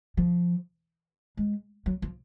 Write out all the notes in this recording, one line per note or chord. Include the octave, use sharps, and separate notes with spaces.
F3
G#3
F#3
F3